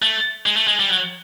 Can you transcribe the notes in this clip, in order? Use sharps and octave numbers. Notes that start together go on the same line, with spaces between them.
A3
G#3
A3
G#3
G3
F#3